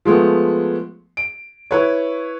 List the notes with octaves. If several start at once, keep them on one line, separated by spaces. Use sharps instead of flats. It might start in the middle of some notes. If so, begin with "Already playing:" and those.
F3 G#3 A3 B3
D7
E4 B4 C#5